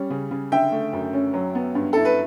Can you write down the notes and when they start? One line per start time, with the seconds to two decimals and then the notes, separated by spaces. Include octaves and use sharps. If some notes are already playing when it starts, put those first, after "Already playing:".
Already playing: G3 C#4
0.10 C#3
0.31 C#3
0.52 D3 E5 G5
0.72 A3
0.93 F#2
1.13 C#4
1.34 F#3
1.55 B3
1.75 G2
1.93 E4 A4
2.05 B4